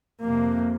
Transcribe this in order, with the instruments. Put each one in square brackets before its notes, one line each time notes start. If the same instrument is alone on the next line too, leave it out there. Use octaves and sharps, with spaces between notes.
[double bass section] F2 C3 A#3